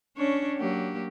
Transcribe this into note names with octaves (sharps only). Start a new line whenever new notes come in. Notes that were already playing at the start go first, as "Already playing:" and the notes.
C#4 D4 C#5
F#3 A#3 G4